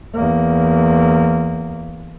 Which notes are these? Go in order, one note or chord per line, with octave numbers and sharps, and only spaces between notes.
E2 A#3